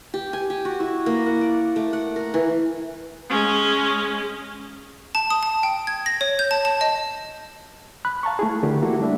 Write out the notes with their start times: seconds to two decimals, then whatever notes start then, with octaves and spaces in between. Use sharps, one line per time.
0.14 G4
0.33 G#5
0.50 G4
0.65 F#4
0.80 E4
1.06 A#3
1.26 F#5
1.41 D5
1.76 A3
1.93 F#5
2.16 A#4
2.34 E3
3.30 G#3 C#4
5.15 A5
5.30 D#6
5.43 A5
5.63 G5
5.87 G#6
6.06 A#6
6.21 C#5
6.39 G6
6.51 A5
6.65 A5
6.81 D#5
8.05 B5 F#6
8.23 F5 A5 A#5 C#6
8.39 A3 E4 G#4
8.63 D3 E3 A3 G4 A#4
8.82 A#3 E4 F#4 A4
8.99 G3 A3 D4 E5